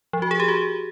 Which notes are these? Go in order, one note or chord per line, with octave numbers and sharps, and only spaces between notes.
F3
F#4
G#4
G4
F#4